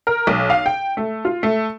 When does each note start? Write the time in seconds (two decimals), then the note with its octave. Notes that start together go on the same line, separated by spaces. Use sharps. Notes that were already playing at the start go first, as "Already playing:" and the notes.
0.07 A#4
0.27 B1
0.50 F5
0.66 G5
0.97 A3
1.25 F4
1.43 A3